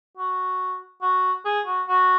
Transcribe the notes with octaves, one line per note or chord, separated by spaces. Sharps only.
F#4
F#4
G#4
F#4
F#4